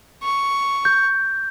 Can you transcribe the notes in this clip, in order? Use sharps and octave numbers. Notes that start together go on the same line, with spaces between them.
C#6
G6